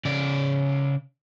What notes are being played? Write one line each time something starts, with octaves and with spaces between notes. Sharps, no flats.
C#3 D5